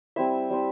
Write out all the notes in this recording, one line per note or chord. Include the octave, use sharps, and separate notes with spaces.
G3 C4 E4 E5
G3 C4 E4